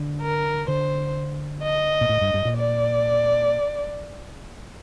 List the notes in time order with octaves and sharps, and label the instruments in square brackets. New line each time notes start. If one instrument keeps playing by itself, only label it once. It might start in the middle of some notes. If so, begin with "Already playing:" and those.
Already playing: [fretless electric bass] D3
[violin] A#4
[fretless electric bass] D3 [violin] C5
[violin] D#5
[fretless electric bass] A#2
A2
G2
G2
A#2
[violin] D5